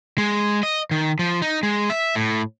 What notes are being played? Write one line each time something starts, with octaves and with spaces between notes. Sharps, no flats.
G#3
D#5
D#3
F3
D#4
G#3
E5
A2